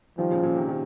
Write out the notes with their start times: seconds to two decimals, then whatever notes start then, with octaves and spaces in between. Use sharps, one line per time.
0.18 D#3 F3 G3
0.31 A#2 C#3
0.43 A#2 C#3
0.55 C3 D#3
0.68 C3 D#3